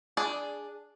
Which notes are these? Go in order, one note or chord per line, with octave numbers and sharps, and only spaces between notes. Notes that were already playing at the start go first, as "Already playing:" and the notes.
D4 G#4 D5